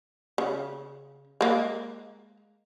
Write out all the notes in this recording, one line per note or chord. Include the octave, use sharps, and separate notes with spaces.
C#3
G#3 A#3